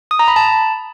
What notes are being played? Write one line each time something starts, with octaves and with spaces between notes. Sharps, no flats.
D#6
A#5
B5
A5